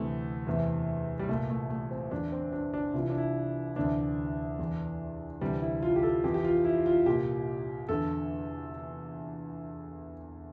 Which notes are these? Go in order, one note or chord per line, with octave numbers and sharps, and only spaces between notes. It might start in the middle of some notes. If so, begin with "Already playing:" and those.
Already playing: D2 C3 E3 A3
E2 C3 E3
G3
C2 A#2 A3
A3
A3
C4
E2 D3 D4
C4
D4
D4
C2 C3 E3 F4
E4
D4
E4
D2 C3 E3 D4
E2 E3
D2 C3 E3 G3
E4
F4
G4
A4
F2 E3 G4
G4
F4
E4
F4
C2 A#2 G4
E2 D3 A4